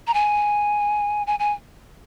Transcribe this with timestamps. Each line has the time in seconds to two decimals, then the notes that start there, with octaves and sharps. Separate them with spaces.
0.07 A#5
0.14 G#5
1.27 G#5
1.39 G#5